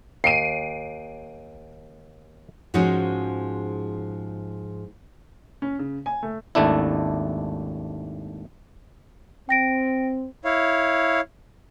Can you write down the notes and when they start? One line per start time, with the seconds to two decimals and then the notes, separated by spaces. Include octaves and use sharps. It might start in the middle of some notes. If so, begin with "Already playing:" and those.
0.24 D#2 C7 D7 D#7
2.74 G#2 F3 G#3 C#4 D#4 F#4
5.62 C#4
5.79 C#3
6.06 G#5
6.23 A3
6.55 G#1 D#2 A3 D4 E4
9.49 C4 G5 A#6 D7
10.44 E4 C#5 F5